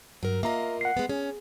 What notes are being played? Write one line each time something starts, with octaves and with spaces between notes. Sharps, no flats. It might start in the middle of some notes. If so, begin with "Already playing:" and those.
G2 F#3 A#4
A#3 F4 D#5 E5 A#5
F#5 C7
G#3 B3
C#4 G#4